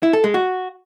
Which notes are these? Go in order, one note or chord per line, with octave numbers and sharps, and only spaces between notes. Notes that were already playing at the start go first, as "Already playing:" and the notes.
E4
A4
G#3
F#4